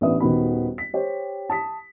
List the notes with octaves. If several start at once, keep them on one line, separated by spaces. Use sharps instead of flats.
A1 B3 D4 B4 E5 D#6
D#1 D#3 B3 F#4 B5
B6
G4 C5 C#5 G5
A5 D#6 B6